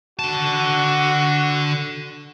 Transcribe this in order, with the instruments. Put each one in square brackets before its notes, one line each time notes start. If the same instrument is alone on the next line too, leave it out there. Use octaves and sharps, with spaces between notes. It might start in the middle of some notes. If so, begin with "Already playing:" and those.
[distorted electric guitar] D3 A5 [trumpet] F#4